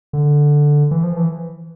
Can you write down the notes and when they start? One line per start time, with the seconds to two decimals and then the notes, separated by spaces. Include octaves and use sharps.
0.13 D3
0.91 E3
1.03 F3
1.17 E3